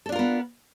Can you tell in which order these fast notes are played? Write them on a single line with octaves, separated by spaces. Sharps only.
A4 D4 F4 A#4 B3